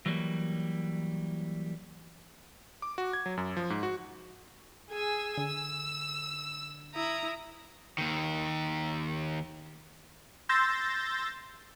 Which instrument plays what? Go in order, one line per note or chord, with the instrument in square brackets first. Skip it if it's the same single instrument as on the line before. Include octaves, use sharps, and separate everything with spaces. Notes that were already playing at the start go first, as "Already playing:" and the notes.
[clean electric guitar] E3 F#3 G3 A#3
[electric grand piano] D6
F#4
G#6
F#3
F#2
F3
G#2
F#4
[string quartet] G#4 G#5 E6
[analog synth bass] D3 [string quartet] E6
[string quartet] E4 A#5 D#6
[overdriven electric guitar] D#2 D#3
[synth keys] C6 E6 G6 A6 A#6